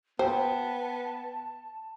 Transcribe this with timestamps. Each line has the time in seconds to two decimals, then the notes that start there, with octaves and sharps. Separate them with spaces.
0.19 B3 C5 G5 A5